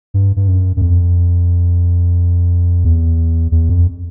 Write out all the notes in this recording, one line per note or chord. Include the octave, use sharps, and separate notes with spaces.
G2
G2
F#2
F#2
F2
E2
E2
F2